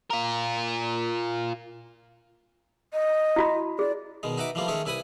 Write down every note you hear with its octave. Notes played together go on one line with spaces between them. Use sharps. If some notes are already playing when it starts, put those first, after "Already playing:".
F4 A#4
D#5
E4 F#4 B5
G#4 D5
B2 D#3 G#3
D#4 F#4 B4 E5 D6
E3 F3 G3 A3 A#3 F4
D#3 G#3 A3 C#4 G#4 C#5
C2 E4 B4 G#5 B5 D#6